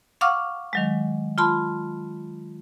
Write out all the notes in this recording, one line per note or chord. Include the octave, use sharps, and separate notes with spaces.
F5 F#5 C#6 D6 E6 F6
D#3 F#3 G#3
F4 A5 B5 C6